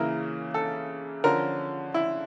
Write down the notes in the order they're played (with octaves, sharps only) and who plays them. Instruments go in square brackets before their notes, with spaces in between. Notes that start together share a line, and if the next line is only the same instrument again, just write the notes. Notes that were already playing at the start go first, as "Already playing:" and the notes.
Already playing: [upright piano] C#3 E3 A#3 E4 [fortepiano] A#4
[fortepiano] A4
[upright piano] D3 F3 C#4 [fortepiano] A#4
[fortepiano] E4